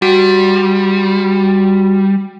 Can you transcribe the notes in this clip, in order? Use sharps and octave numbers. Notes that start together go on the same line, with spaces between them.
G3 F#4